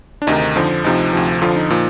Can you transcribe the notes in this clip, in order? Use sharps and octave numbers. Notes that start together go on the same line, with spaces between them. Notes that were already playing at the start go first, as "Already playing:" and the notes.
D4
D2 C3 D#3 D#4
F2 D3 F3
D2 C3 F3 D#4
D2 C3 F3
F2 D3 F3 F4
D#4
A#2 F3